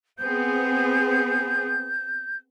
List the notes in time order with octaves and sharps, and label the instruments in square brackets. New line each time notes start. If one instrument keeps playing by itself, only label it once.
[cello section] B3 C4 G#4 [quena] G6